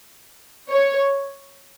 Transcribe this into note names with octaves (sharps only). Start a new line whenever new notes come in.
C#5